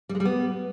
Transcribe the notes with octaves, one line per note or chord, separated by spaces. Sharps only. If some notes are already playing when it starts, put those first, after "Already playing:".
G3
G#3
G3
B3